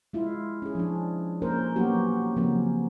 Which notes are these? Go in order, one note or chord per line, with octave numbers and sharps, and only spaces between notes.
G#3 E4 F4
C#4 G#4
F3 D4
A#3 C#4 A#4 C5
F#3 A#3 B3 C#4 F#4 G4
C#3 F3 F#3 A#3 C4 C#4